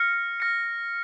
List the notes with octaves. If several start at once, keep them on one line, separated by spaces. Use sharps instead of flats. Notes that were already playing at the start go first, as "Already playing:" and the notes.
Already playing: F6 A#6 C#7
F6 A#6 C#7